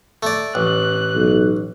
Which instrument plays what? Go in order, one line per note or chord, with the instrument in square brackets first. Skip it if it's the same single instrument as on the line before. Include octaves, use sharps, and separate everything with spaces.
[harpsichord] A3 D5
[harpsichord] A1 [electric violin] F#6
[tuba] B1